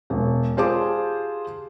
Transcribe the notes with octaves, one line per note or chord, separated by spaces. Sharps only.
E1
F4 G4 G#4 C5 A5 D6